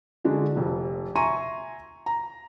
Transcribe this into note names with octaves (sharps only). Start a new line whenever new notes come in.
D3 G#3 D4 F#4
F1 F2
E5 G#5 A#5 C6 C#6 D#7
A#5